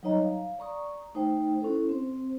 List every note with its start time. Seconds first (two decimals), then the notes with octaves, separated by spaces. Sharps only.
0.03 F#3 G3 D#4 C#5 D#5 A#5
0.24 F5
0.59 D5 A#5 C#6 D#6
1.15 A3 D#4 C5 G5
1.60 C#4 E4 A4 C5
1.89 C4 C5